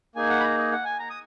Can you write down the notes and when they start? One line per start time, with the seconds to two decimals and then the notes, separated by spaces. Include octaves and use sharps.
0.15 A#3 D#4 G#4 G#5
0.29 F#5
0.40 B5
0.43 A#5
0.58 D#5
0.72 F#5
0.85 G#5
0.99 A#5
1.10 D#6